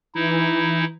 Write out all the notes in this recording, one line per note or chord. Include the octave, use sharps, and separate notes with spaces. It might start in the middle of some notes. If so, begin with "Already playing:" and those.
E3 D#4 E4